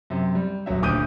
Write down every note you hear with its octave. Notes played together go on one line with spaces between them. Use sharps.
F#2 C3
G3
D#1 F#2 F#3 E5
D#1 D2 D6 D#6 G6 D#7